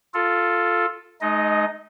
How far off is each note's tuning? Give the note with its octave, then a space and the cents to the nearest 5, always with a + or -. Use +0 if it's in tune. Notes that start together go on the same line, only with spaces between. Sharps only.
F4 +0 A4 +0
G#3 +40 D#4 -5 D#5 +0